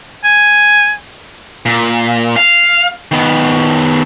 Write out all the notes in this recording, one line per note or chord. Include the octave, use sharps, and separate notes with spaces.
G#5
A#2
F5
D#3 B3